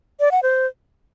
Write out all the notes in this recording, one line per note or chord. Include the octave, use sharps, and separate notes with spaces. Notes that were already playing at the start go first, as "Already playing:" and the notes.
D5
F#5
C5